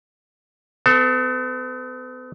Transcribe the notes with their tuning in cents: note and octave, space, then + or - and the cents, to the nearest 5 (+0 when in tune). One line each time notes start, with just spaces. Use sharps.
B3 +45 A4 +0